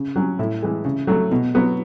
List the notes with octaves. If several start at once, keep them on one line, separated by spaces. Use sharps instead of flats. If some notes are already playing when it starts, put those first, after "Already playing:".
Already playing: C#3
F#3 C#4
A2 E4
E3 G#3
C#3
F#3 A3
B2
F#3 B3